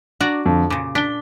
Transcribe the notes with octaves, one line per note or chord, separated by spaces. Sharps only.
D4 F#4 D5 A#5
F2 D3
A#2 C#3 D6
D4 B6 G7